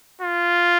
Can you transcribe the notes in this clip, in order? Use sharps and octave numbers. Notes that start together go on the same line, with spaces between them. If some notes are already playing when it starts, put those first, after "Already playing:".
F4